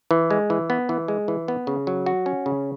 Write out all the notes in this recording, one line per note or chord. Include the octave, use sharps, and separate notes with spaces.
E3
G#3
E3
B3
E3
G#3
E3
B3
C#3
F#3
F#4
C#4
C#3